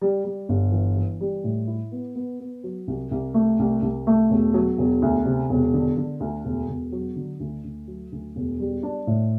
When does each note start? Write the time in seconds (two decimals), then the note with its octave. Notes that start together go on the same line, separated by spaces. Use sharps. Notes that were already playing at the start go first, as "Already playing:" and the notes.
0.01 G3
0.24 G3
0.49 G1
0.72 E3
0.97 E3
1.21 G3
1.44 A2
1.67 E4
1.92 B3
2.16 B3
2.40 B3
2.64 F#3
2.88 C2
3.11 C2
3.34 A3
3.59 C2
3.82 C2
4.07 A3
4.30 E1
4.54 F#3
4.78 E1
5.02 D2
5.25 C3
5.50 E1
5.74 D3
5.97 D3
6.20 D2
6.45 E1
6.69 E1
6.92 F#3
7.16 D3
7.40 D2
7.64 D2
7.88 F#3
8.12 D2
8.36 E1
8.60 G3
8.83 D4
9.07 A2